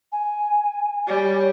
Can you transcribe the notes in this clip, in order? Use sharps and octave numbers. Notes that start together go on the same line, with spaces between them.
G#5
G3 C#5